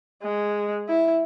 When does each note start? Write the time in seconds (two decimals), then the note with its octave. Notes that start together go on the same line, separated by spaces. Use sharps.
0.23 G#3
0.88 E4